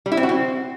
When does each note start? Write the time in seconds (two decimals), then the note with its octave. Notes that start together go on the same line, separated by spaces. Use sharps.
0.06 G3
0.12 E4
0.17 C4
0.23 F#4
0.29 C4